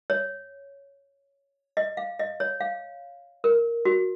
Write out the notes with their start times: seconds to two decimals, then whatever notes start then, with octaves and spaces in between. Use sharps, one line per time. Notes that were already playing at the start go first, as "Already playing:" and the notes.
0.10 C#5
1.77 D#5
1.97 F5
2.19 D#5
2.40 C#5
2.60 F5
3.44 A#4
3.85 F#4